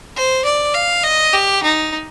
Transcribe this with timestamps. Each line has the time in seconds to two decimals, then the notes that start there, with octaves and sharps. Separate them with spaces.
0.16 C5
0.45 D5
0.75 F5
1.04 D#5
1.34 G4
1.63 D#4